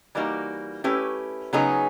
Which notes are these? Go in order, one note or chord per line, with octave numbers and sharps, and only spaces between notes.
E3 G3 A#3 D#4 F#4
A3 C#4 E4 G4 B4
C#3 F#3 B3 D#4 G#4